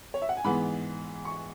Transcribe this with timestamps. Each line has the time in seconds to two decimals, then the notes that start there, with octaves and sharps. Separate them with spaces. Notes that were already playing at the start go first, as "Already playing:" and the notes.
0.14 C#5
0.22 E5
0.29 F#5
0.37 G#5
0.44 G#2 E3 G#3 B3 B5
1.25 C#6